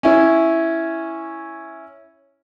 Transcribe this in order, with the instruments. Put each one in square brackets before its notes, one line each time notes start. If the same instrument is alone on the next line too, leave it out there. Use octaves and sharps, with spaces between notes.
[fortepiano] C#4 E4